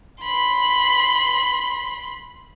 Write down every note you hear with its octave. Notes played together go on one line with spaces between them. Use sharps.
B5 C6